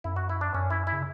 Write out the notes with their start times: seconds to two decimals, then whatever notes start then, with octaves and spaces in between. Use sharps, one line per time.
0.04 F#2 E4
0.16 F#4
0.29 E4
0.41 D4
0.54 F#2 C#4
0.70 E4
0.87 E4
0.93 C#3